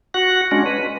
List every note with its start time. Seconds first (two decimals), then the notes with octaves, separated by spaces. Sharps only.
0.14 F#4 F#5
0.51 G#3 C#4 D4 F#4
0.66 B4